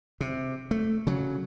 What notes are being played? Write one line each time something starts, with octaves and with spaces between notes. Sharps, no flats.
C3
A3
C#3 F#3